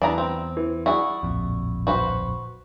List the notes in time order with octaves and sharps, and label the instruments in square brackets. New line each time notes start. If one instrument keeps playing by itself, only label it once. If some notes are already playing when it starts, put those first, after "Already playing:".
[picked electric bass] E2 [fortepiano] B3 E4 A#5 [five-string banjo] D4 G#4
[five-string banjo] C4
[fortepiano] E3
[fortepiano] E4 D5 [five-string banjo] F#4 G#4
[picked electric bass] D1 A#1 F2
[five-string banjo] F#4 B4 C5